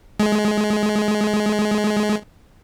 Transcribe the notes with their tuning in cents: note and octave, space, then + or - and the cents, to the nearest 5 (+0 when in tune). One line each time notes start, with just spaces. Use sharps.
G#3 +20